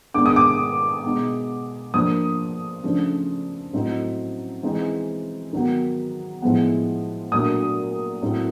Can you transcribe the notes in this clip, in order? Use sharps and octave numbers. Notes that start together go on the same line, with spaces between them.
D#3 G#3 B3 D4 D6
D#6
D6
B2 G#3 B3 D#4
F3 A#3 D4 D#6
C#3 F3 A3 D4
A2 F#3 A3 C4 D#4
E3 G#3 C4 D#4
D#3 F#3 B3
A2 F3 G#3 B3
A#2 F#3 A3 D4 D#6
A2 F#3 A3 C4